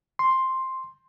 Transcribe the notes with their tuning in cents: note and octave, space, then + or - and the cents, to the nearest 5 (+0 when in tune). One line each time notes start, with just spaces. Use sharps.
C6 +5